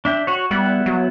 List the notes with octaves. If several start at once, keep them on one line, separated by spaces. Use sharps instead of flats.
D4 E5 G5
F#4 C#5
G3 B3 E4 F#5
F#3